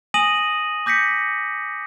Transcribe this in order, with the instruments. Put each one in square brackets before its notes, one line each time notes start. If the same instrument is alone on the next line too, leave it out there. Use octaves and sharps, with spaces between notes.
[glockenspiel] G#5 D#6 A#6 D#7 F#7
D6 G6 A#6 B6 C#7